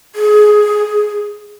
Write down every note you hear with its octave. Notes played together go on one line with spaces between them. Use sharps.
G#4